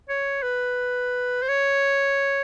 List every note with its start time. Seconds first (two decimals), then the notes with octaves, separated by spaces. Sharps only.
0.09 C#5
0.43 B4
1.42 C5
1.48 C#5